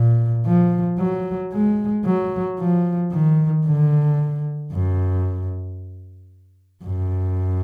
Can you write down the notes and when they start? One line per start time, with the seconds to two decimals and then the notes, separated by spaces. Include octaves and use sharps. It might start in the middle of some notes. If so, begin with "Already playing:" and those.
Already playing: A#2
0.46 F3
0.99 F#3
1.53 G#3
2.05 F#3
2.60 F3
3.12 D#3
3.66 D3
4.72 F#2
6.85 F#2